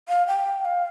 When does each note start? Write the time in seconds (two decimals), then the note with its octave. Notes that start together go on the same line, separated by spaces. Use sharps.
0.09 F5
0.27 G5
0.65 F5